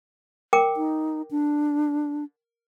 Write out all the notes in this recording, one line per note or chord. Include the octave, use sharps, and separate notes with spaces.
A#4 G5 D6
D#4
D4